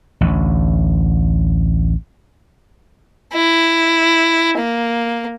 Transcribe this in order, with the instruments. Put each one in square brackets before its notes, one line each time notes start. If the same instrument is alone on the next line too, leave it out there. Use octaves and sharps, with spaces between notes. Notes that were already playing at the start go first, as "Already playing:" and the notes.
[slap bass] A1 D2
[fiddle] E4
A#3